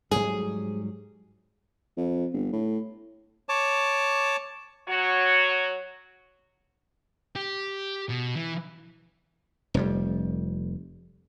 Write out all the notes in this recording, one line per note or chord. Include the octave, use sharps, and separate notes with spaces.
G#2 F#3 G3 G#4
F2
G1
A2
C#5 A5 D6
F#3 F#4 C#5
G4
B2
E3
F1 F2 G3